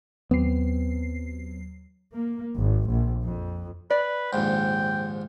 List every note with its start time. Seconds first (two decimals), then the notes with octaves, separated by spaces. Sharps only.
0.31 D#2 F#3 B3 C4 C7
2.14 A#3
2.56 G#1
2.89 A#1
3.23 F2
3.90 B4 D5
4.33 A#1 D#2 G#2 G5